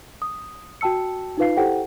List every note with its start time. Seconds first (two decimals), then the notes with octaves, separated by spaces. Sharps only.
0.22 D#6
0.81 F#4 G5 A5 E6 C#7
1.37 D#4 F4 B4 F5 C7
1.57 E4 G4 A4 C5 F#5 G5